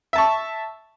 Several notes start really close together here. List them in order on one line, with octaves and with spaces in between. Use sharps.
E5 A5 C#6